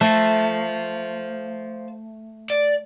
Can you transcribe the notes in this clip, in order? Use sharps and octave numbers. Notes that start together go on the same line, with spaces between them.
A3 C5 F5
D5